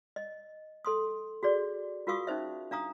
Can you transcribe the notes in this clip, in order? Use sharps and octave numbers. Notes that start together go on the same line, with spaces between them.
D#5
A4 C6 D#6
F#4 G#4 D5
F4 F#4 A#4 F5 C#6 D#6
C#4 D#4 C5 E5
D4 F5 A#5 D#6